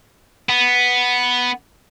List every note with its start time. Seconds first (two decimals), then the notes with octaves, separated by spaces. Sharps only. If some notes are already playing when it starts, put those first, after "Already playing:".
0.49 B3